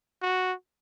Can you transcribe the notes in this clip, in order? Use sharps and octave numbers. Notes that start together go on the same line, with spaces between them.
F#4